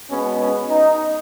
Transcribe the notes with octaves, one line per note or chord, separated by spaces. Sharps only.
B2 G#3 B3 C#4
C#4
D#4